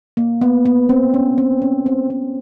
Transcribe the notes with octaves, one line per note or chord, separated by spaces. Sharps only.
A#3
B3
B3
C4
C#4
C4
C#4
C4
C4